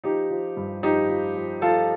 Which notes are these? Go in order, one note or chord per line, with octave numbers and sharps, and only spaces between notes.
F3 D#4 G4
F3
G2
F3 D#4 G4
F3
F3
F3 F4 A4